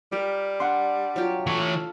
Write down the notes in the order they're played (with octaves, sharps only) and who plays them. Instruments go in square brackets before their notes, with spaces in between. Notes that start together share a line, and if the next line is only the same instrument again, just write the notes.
[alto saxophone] G3 [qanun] G4 A#4
[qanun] D4 [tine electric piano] F#5 C6
[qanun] F#3 F4 G4
[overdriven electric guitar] E3 C#5 [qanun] A4 F5